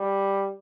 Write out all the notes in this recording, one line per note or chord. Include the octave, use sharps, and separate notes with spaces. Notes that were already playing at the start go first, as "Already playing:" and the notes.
Already playing: G3